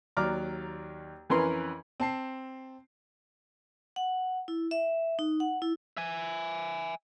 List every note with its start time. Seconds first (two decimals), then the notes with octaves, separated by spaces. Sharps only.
0.17 D#2 F#3 D5 A#5 D6 F6
1.30 F2 E3 C#4 A#4 B4 C6
2.00 C4 A5 C7
3.96 F#5
4.48 E4
4.71 E5
5.19 D#4
5.40 F#5
5.62 E4
5.97 E5 G#5